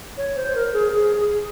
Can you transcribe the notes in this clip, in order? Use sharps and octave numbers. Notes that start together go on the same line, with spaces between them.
C#5
C5
A#4
G#4
G#4
G#4